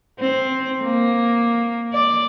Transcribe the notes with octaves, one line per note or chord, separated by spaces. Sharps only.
C4
A#3
D5